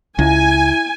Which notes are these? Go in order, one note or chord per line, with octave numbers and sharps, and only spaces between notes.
C#2 E4 G#5